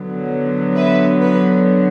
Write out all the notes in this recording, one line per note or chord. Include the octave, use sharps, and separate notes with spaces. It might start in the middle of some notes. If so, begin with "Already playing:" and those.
Already playing: D3 F#3 B3
B4 E5
B4